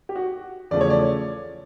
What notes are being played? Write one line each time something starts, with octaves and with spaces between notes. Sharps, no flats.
G4
F#4
E2 C#3 F3 A3 D5
C#5
D5